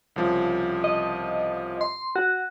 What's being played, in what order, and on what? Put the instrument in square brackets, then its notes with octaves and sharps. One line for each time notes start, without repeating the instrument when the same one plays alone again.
[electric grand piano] C2 C#3 F3
[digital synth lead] D#5
C6
F#4